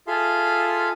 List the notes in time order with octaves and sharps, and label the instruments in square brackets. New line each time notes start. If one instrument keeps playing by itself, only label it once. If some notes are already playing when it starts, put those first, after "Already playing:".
[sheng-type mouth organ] F4 G#4 A4 E5 F5 C6